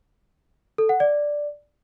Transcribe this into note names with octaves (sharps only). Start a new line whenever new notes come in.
A4
F#5
D5